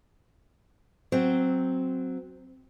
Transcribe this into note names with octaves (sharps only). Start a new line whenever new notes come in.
F#3 C4 C5